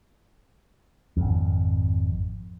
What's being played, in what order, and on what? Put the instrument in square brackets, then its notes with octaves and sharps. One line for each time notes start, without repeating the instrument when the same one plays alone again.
[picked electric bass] G#1 F2